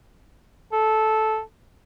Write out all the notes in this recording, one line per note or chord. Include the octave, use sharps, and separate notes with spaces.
A4